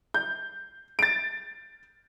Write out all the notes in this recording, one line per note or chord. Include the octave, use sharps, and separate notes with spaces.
G6
A6 D7